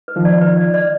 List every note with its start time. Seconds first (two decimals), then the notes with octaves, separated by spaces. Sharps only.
0.08 B4
0.16 D#3 F3
0.25 D5
0.41 B4
0.57 D5
0.74 D5